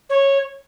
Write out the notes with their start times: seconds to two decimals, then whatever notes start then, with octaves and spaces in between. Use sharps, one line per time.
0.10 C#5